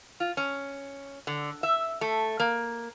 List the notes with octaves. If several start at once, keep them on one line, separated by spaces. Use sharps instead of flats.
F4
C#4
D3
E5
A3
A#3